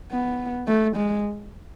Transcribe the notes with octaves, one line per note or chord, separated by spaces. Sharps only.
B3
A3
G#3